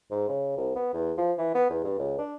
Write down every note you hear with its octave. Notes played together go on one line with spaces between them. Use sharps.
G#2
C#3
C2
B3
E2
F3
E3
B3
E2
G2
C#2
D4